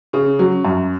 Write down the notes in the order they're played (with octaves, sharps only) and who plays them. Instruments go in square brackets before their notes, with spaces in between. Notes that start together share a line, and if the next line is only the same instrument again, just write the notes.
[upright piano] C#3 [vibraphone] C#4
[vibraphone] C#4
[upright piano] F#3 [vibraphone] C#4
[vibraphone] C#4
[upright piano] F#2 [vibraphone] C#4